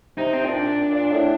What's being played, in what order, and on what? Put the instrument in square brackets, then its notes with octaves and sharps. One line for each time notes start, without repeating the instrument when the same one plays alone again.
[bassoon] C3 [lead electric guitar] D#4
[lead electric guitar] C4
[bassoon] A#2 [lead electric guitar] D4
[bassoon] A#2
A2